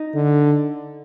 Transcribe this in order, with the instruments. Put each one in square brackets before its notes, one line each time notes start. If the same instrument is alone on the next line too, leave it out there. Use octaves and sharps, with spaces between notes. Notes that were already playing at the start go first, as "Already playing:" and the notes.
Already playing: [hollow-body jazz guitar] D#4
[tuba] D3